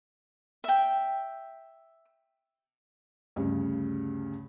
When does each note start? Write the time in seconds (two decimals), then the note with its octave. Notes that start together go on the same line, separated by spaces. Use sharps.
0.64 E5 G5
3.36 D2 G2 C#3